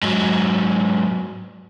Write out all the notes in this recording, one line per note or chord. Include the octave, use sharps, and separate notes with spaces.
G#2 F#3